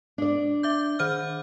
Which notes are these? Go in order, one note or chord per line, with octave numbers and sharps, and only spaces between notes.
D4 D5
E5 D6 G6
D#3 C5 F6